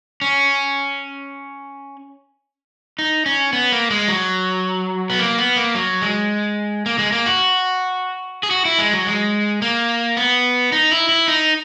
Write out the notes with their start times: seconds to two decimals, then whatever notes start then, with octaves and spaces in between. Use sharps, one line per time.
0.21 C#4
2.99 D#4
3.26 C#4
3.53 B3
3.72 A#3
3.91 G#3
4.08 F#3
5.10 B3
5.19 A#3
5.38 B3
5.56 A#3
5.75 F#3
6.02 G#3
6.86 A#3
6.99 G#3
7.12 A#3
7.26 F#4
8.43 G#4
8.51 F#4
8.65 E4
8.78 G#3
8.93 F#3
9.07 G#3
9.62 A#3
10.17 B3
10.72 D#4
10.91 E4
11.09 E4
11.28 D#4